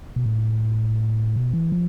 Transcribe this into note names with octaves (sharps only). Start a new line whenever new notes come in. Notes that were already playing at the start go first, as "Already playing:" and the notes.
B2
A2
B2
E3
F3